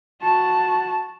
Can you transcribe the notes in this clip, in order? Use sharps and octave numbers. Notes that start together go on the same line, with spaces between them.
F#4 A5